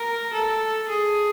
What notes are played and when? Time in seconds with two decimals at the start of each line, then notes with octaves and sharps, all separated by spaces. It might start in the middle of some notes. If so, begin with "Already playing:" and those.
Already playing: A#4
0.33 A4
0.88 G#4